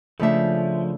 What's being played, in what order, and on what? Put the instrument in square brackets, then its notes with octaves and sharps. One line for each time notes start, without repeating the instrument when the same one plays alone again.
[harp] C#3 A3 D4 [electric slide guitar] F3 [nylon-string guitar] A4 E5